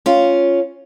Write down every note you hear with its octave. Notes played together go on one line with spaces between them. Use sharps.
C#4 F4